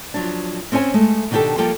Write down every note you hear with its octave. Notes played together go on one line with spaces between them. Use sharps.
F3 F#3 D4
C4 C#4 C5 C#5 G#5
G#3 A3
B2 D#3 D4 D#4 G4 A4
F3 G3 A#3 F4 A4 G5